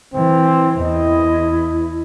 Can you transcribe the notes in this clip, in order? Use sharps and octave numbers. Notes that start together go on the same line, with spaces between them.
E3 C4
E2 E4 D#5